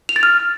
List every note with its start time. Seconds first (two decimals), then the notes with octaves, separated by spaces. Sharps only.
0.09 F7
0.16 A6
0.23 F6